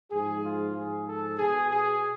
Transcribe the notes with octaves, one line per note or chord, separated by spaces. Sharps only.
G#2 F3 G#4
F4
G#2 F3 G#4
A4
B2 G#4
G#4